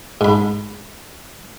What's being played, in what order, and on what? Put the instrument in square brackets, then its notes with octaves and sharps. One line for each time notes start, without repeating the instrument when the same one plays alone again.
[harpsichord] G#2 B5